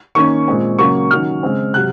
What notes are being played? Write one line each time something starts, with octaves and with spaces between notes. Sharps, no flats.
D#3 A#3 C#4 C#6
A#2 G#3 C4
C#3 F#3 A#3 C#4 C#6
D#3 F#3 C#4 F6
C#3 G#3 C4
C3 F#3 F#6